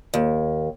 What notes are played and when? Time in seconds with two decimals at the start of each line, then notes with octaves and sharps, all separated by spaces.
0.14 D#2